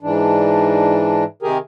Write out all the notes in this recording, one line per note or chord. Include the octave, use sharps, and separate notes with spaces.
G#2 E3 D4
C3 D#3 G4 G#4 A#4